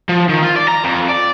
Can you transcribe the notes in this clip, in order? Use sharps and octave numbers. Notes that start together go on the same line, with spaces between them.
F3
D#3
F4
D5
A#5
F2
D5